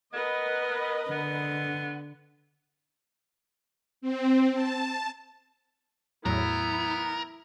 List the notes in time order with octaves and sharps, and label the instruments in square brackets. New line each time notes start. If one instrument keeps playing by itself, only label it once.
[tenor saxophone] B3 [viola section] A#4 B4 D#5
[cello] D3 [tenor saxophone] B3
[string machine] C4
A5
[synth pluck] E2 A2 F#3 [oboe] B3 [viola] E4 [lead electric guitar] A#4